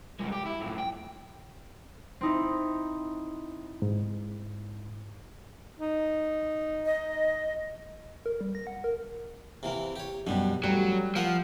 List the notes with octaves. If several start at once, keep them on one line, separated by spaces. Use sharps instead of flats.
C2 G#3
G4
E4
F#2 A2
G5
C4 D#4 E4
G#2
D#4
D#5
A#4
G3
A#6
F#5
A#4
C3 E3 A#3
G4 C#5
F#2 B2 G3 D4
A1 F#3 G3
F3 A#3 A#4 F#5